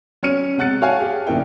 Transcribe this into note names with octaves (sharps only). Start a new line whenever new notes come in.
F#3 C#4 C#5 F6 C#7 D#7
C3 G#3 F#5 F#6 A6 C#7
F#4 C#5 F5 G#5 A5
G4 G#4
A#1 C#3 A#3 E4 G5